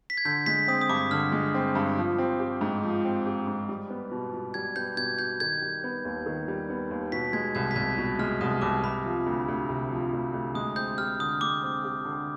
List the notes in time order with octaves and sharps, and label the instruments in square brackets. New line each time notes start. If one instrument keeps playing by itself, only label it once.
[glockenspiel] B6
G#6
[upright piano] D3 [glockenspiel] G6
[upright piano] G#3 [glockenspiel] B6
[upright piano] C4 [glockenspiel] D#6
[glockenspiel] D#6
[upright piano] G2 [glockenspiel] D6
[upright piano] D3 [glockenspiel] F6
[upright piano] G#3
C4
G2
F3
C4
G4
G#2
F3
C4
G4
G#2
G3
B3
B2
B2
[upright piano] G3 [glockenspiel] G#6
[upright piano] B3 [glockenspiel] G6
[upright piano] B2 [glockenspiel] G#6
[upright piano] B2 [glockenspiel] G6
[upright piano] D#3 [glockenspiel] G#6
[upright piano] G3
B3
D#2
D#3
G3
B3
D#2
[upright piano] B2 [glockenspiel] B6
[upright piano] G#3 [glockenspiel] G#6
[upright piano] C2 [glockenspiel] G#6
[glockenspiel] B6
[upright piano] C2 [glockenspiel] G#6
[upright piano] B2
[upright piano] G#3 [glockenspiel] F6
[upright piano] C2 [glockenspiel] D#6
[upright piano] C2 [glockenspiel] D6
[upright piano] C3 [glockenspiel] B5
[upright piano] F3
D2
D2
C3
F3
D2
D2
[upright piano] G#3 [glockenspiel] D#6
[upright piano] C4 [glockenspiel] G6
[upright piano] G4 [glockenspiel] F6
[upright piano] D3 [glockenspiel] D#6
[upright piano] G#3 [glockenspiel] D6
[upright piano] C4
G4
D3